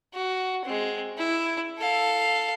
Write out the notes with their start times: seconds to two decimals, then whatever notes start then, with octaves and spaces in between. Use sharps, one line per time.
0.14 F#4
0.65 G#3 C4
1.17 E4
1.79 A4 F5